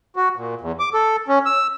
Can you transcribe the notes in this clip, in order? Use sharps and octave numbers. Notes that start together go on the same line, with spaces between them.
F#4
A#2
E2
D6
A4
C#4
E6